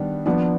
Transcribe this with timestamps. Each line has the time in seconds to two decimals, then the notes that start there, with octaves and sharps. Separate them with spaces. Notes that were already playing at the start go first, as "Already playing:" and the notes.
Already playing: D#3 G3 B3 D4
0.26 F3 B3 D4